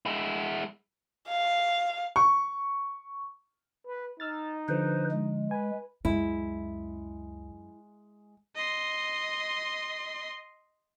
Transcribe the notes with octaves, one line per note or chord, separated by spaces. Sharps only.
G#3 E4
F5
C#6
B4
D#4 E6 F6 A6
D3 F3 B4 C5
G#3
B4 G#5
C#2 F#2 G#3 E4
D#5 C6